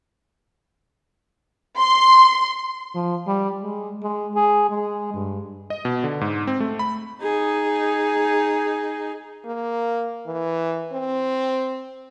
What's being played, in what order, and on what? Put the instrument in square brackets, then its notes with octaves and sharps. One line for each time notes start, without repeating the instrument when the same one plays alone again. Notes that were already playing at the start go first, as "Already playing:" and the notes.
[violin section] C6
[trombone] F3
G3
G#3
G#3
G#4
G#3
G2
[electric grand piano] D#5
B2
D3
G#2
C4
A3
B5
[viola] D#4 G#4
[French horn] A#3
E3
C4